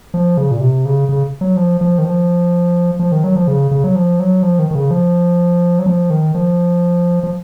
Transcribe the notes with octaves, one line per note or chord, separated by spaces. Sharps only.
F3
C#3
A#2
C3
C#3
C#3
F#3
F3
F3
D#3
F3
F3
D#3
F#3
F3
C#3
C#3
F#3
F3
F#3
F3
D#3
D#3
C#3
F3
F#3
F3
D#3
F3
F3